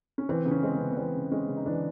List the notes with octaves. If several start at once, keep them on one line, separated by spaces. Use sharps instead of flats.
C#4
E3 C4
C#3
C#4
G#3 C4
B3
C#3
B3
E3 C4
C#3
G#3 C#4
C#3
D#4
E3 D4